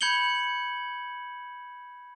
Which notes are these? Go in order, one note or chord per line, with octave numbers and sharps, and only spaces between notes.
B5 G6 G#6 C#7 F#7 G7